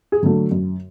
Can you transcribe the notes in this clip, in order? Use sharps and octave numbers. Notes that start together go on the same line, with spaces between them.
G#4
D3 F#3 A3
F#2